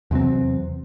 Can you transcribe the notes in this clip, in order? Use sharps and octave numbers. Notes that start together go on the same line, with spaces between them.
E2 C3 F#3 C4